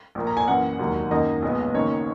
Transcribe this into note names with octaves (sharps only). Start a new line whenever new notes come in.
A#1 A#2 A#3
A#5
G#5
F#2 E3 A#3 F#5
E1 D#2 D#3 F#3 A#3
F#2 D#3 A#3 D#5
B1 A#2 G#3 B3
F#1 F#2 D#3 A#3 C#5